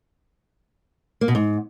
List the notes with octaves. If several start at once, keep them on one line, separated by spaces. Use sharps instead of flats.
A#3
B2
G#2